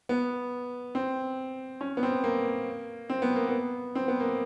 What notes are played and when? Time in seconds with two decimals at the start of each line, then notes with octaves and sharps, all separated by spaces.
0.09 B3
0.95 C4
1.81 C#4
1.97 B3
2.03 C4
2.24 A#3
3.10 C4
3.22 B3
3.36 A#3
3.48 B3
3.95 C4
4.08 B3
4.20 A#3